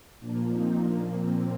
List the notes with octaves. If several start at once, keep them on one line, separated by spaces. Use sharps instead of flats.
A#2 F3 A#3 D4
C4 D#4
A#2 F3 A#3 D4
C4